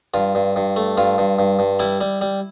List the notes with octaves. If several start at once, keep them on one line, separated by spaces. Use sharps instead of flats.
G2 F4
G2
G2
A3
G2 F4
G2
G2
G2
G3 E4
G3
G3